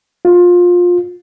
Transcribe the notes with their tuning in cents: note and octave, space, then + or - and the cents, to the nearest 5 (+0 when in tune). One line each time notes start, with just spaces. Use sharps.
F4 +20